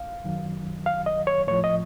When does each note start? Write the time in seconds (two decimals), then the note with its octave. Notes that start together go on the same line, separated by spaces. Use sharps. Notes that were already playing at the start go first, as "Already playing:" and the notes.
Already playing: F5
0.24 F#2 D#3 F#3
0.86 F5
1.06 D#5
1.27 C#5
1.47 A2 F3 C#5
1.64 D#5